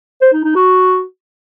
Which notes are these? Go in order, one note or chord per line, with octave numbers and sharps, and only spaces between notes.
C5
D#4
D#4
F#4